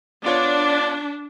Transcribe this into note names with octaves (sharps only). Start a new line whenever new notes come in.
B3 D4 F4 C#5 D5